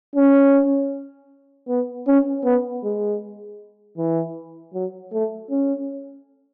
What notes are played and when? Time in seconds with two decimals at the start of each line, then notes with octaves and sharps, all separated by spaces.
0.16 C#4
1.69 B3
2.07 C#4
2.45 B3
2.84 G#3
3.97 E3
4.74 F#3
5.13 A3
5.50 C#4